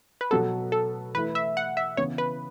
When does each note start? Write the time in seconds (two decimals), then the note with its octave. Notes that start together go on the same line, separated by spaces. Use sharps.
0.21 B4
0.31 B2 F#3 B3 F#4 A4
0.72 A4
1.14 E3 A3 E4 B4
1.35 E5
1.57 F#5
1.77 E5
1.97 C#3 E3 B3 E4 C#5
2.18 B4